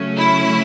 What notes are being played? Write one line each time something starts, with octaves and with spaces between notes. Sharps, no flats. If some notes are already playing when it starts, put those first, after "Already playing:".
Already playing: C#3 F#3 A3 C#4
E4